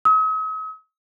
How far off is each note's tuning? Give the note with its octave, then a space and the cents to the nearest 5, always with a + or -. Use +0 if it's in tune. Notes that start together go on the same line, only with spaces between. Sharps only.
D#6 +45